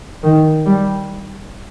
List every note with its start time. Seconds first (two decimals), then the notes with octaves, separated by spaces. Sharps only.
0.24 D#3
0.66 G3